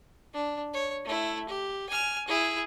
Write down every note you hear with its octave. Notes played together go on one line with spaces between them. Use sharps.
D4
C#5
A3 E4
G4
G#5 F6
E4 G#4